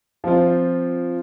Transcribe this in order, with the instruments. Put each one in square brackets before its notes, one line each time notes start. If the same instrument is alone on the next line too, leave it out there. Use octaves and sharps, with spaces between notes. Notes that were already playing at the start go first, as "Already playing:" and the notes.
[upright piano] F3 C4 F4